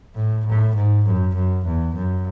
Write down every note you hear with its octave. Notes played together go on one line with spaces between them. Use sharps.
A2
A2
G#2
F#2
F#2
E2
F#2